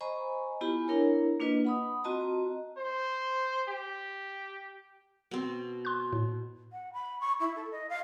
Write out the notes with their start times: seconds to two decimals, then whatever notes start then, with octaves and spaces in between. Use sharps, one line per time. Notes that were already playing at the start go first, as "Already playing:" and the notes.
0.01 C5 D#5 G#5 A#5 B5 C#6
0.61 B3 E4 F4 G4 G#5 B5
0.88 D4 E4 A#4 C#5 A#5
1.40 A#3 D4 F4 B4 D#5
1.65 F#5 B5 D#6
2.04 C4 F4 F#4 D#5 A5 A#5
2.78 C5
3.69 G4
5.31 B2 C4
5.85 C6 F#6
6.13 A2
6.72 F#5
6.93 B5
7.21 C#6
7.40 E4
7.56 A4
7.72 D#5
7.89 F5